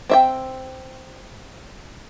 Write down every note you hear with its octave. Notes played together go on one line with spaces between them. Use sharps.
C4 E5 G5